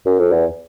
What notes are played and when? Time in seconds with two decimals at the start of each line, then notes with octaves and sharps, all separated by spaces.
0.06 F#2
0.19 F2
0.32 E2